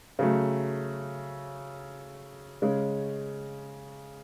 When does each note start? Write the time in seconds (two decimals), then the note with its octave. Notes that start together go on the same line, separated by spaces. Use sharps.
0.19 C#3 F#3 A3
2.62 C#3 G#3 C#4